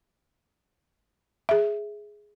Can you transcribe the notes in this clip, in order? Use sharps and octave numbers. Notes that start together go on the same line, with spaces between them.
G#4 E5